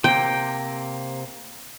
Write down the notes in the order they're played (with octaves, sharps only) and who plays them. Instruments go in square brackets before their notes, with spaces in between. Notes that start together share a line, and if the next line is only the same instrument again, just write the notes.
[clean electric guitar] C3 A#3 [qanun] G5